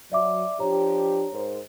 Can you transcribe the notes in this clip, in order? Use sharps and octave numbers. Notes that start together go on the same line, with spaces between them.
F#3 D5 E5 D6
F3 D4 G4 C#5 A#5
G#2 A#4 C5